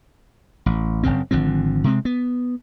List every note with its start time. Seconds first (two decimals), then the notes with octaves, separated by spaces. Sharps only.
0.66 A1
1.03 F#1 C2 C#3 C4
1.31 G#1 D3 F3 C4
1.84 C3 G#3 C4
2.05 B3